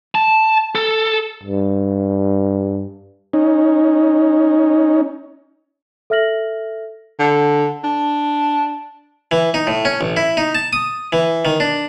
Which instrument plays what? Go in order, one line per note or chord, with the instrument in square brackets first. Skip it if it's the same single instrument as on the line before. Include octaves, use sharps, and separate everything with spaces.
[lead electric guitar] A5
A4
[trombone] G2
[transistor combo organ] C#4 D#4
[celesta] A4 E5 F6 A#6 F#7
[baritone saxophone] D3
D4
[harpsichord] E3
D#4
A2
C#4
A1
E4
D#4
A5
D#6
E3
D#3
D4